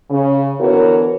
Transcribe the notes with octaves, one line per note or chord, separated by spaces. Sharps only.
C#3
D3 E3 B3 F#4 A#4 C#5